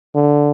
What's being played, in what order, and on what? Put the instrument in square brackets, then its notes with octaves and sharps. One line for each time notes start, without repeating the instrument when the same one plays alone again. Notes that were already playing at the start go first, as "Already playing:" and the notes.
[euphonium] D3